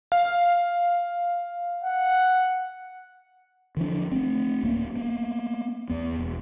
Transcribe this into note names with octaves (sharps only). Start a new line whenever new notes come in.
F5
F#5
D3 E3 F3 D4
A3 B3 C4
D1 A#3 C#4
A#3 B3
E2 B3
E1